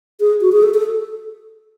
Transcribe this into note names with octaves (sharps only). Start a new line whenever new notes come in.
G#4
F#4
G#4
A4
A4